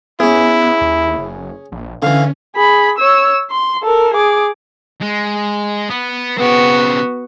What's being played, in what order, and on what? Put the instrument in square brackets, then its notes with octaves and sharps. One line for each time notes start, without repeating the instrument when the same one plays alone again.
[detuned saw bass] B3 [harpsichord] C#4 G#4 [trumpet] E4
[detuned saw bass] D#2
F#1
A#1
[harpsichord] D3 E3 [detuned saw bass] C#4 [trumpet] F5
[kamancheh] G#4 B5
C#5 E6
C6
A4 A#4
G#4 D6
[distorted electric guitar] G#3
B3
[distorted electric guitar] C#3 C4 [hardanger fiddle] B3 F#4